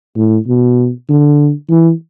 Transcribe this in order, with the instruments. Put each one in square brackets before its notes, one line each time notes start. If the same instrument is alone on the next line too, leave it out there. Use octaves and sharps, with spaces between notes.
[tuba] A2
B2
D3
E3